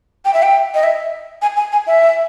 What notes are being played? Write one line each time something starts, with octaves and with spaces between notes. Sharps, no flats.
G5
E5
G5
D#5
E5
G#5
G#5
G#5
E5